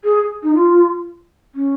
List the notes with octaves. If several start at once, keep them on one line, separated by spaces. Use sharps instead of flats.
G#4
D#4
F4
C#4